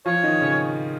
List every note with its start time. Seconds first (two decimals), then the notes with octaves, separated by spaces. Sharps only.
0.06 F3 F4 C#5
0.23 D#3 D#4
0.41 C#3 C#4